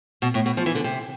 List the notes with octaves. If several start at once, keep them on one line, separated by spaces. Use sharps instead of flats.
B2
A2
B2
F3
E3
D3
C3